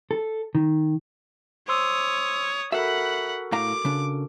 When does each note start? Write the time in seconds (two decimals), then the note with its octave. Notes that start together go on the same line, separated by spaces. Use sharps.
0.11 A4
0.55 D#3
1.68 C5 C#5 C6 D#6 E6
2.72 F#4 A4 A#4 E5 F#5 B5
3.52 A2 F5 A#5 D6
3.85 C#3 D4